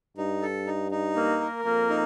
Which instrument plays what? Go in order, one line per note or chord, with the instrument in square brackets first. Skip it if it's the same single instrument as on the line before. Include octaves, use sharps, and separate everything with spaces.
[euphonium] G2 [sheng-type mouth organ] D#4
[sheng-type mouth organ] A4
D#4
D#4
A#3
A#4
[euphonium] F2 [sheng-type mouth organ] A#3
[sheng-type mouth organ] D#4